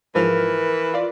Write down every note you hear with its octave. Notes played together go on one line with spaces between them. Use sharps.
G#2 E3 F3 A#4 F6
F4 D5